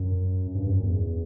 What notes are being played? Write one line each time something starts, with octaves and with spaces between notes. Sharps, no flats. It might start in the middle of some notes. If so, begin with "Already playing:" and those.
Already playing: F#2
G2
F#2
E2